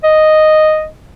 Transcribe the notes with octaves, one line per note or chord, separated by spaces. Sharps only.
D#5